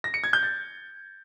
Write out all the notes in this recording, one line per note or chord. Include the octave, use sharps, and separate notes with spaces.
A#6
C#7
G#6
G6
A6